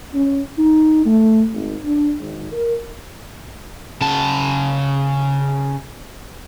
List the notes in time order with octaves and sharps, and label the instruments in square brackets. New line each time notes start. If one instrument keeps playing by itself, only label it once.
[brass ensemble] C#4
D#4
A3
G#1
D4
G#1
A#4
[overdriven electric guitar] C#3 A5